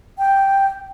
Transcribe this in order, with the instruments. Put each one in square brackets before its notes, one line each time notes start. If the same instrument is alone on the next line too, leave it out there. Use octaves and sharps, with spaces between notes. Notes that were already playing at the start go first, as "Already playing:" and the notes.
[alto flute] G5